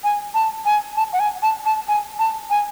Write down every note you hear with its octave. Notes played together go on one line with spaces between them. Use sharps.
G#5
A5
G#5
A5
F#5
G#5
A5
A5
G#5
A5
G#5